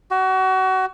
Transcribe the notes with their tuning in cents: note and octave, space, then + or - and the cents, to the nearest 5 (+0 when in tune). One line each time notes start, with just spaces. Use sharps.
F#4 +30